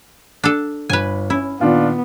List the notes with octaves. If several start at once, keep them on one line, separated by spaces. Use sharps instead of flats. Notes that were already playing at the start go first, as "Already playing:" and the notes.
D4 A4
G1 B4 G#5
C#4 E4
A#2 D#3 B3 D4 F4